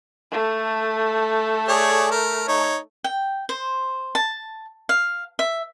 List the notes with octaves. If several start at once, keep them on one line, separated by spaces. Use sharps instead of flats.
A3 A4
G#4 C#5 D5
A#4
D#4 C#5
G5
C5
A5
F5
E5